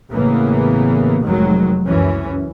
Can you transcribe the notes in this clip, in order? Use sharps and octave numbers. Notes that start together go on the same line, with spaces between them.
A1 C#3 E3 A#3 B3
F1 F2 D#3 F#3 G#3
C#2 F#2 E3 C#4